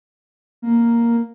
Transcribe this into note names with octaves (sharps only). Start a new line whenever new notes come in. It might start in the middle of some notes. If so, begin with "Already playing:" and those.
A#3